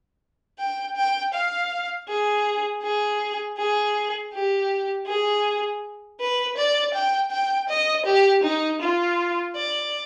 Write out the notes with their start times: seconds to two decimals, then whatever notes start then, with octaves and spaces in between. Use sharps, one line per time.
0.59 G5
0.96 G5
1.34 F5
2.09 G#4
2.83 G#4
3.58 G#4
4.34 G4
5.07 G#4
6.20 B4
6.57 D5
6.94 G5
7.31 G5
7.69 D#5
8.06 G4
8.44 D#4
8.82 F4
9.56 D5